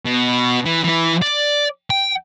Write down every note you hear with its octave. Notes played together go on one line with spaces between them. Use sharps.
B2
E3
E3 E4
D5
G5